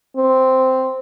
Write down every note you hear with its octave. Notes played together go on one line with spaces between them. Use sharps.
C4